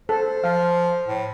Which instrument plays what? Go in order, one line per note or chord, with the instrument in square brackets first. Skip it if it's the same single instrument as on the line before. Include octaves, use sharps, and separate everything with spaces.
[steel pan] A4 [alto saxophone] C5
[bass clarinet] F3 [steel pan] F5
[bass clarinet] A2